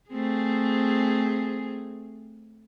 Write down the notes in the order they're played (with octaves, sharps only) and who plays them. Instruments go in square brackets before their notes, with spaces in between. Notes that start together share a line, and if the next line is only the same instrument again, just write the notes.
[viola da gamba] A3 C4 G#4